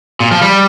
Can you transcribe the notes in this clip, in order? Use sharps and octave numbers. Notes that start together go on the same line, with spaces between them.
A#2
F3
G3